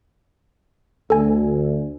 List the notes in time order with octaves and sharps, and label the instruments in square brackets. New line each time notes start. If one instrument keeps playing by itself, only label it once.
[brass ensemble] D2 [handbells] A4 G#5